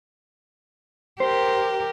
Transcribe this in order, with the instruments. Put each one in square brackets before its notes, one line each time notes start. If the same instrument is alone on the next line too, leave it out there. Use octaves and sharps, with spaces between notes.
[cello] G4 A#4 [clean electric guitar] C5